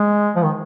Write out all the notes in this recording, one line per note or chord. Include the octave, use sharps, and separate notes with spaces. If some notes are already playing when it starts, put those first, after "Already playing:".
Already playing: G#3
F3
D#3